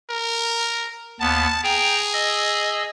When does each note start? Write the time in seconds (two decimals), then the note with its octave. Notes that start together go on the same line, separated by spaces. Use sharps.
0.10 A#4
1.20 D#2 B3 A5
1.64 G#4 G5 A#5
2.13 D#5 E6